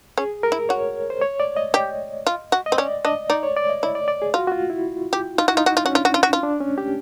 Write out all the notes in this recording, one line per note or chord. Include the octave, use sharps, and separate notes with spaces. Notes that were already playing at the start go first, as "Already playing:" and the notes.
C#4 G#4
A#4
E4
F#4 C#5
C5
C#5
D5
D#5
G4
F4
F#4
D#5
C4
C#4 D5
D4 D#5
D#4 D5
C#5
D5
D#5
E4
D5
D5
G#4
F4 F#4
F#4
F4
E4
G4
D#4 F4
E4 F#4
D#4 F4
F#4
F4
C#4 F#4
D4 F4
F#4
F4
F#4
F4
D4
C#4
G4